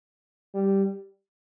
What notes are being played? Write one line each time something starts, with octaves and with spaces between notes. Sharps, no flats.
G3